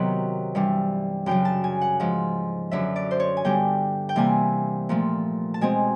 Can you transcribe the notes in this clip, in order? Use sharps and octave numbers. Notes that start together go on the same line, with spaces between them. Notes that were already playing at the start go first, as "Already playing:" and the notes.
Already playing: C3 D#3 F#3 B3 F#5
G2 E3 G3
F#2 C#3 F#3 G5
A5
G#5
F#5
G#2 F3 G#3
F#2 D3 F#3 E5
D5
C5
C#5
G#5
G2 D3 G3 B3 G5
G5
C3 E3 G3 A#3 G#5
A#2 F3 A3
A5
B2 G#3 C4 G#5